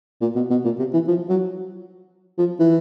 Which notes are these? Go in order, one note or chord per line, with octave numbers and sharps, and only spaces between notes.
A#2
B2
B2
A#2
C3
E3
F3
F#3
F3
E3